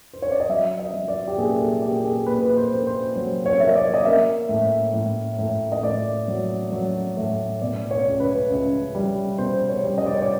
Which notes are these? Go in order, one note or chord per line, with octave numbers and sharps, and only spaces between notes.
C5
C#5
D5
D#5
F#3 E5
D#5
F#3
D5
G4
A#2 G#4
A4
A#2 G4
G#4
A#2 B4
B4
C5
A#3
C5
F#3 C5
C#5
A#3 E5
D#5
D5
D#5
A#3 E5
A2
A2
A2
D#5
A2 D5
F#3
F#3
A2
B2 D5
C#5
C#2
B4
C#2
G3
B2 C5
C#5
G3
D#5
D5
C#5
D5